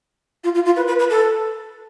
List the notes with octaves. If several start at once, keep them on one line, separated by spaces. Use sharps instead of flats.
F4
F4
F4
B4
B4
B4
A4